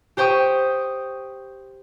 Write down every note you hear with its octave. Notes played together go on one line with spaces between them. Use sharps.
G4 C5 G5 C#6 D#6